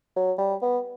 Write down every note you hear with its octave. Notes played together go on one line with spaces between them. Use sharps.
F#3
G3
B3